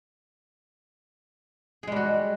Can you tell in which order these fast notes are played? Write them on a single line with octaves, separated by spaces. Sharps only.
G#4 G#3 G3 F#4